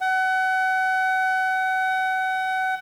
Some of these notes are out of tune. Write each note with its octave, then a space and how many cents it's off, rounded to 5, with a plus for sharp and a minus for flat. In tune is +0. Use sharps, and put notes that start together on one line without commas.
F#5 +30